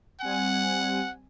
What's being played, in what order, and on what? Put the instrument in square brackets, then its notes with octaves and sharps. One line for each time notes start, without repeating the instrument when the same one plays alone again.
[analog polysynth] G3 C4 G#5 [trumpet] F#5